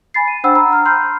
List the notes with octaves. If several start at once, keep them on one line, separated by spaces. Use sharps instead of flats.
G#5 B5 A6 C7
D#7
D4 C5 F#5 G5 B5 E6
A#5 B5 E6
A#5 F6
B5 C6 F6 G6 C7